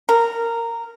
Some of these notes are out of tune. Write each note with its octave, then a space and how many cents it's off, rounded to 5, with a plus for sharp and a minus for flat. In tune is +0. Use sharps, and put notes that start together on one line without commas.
A#4 -10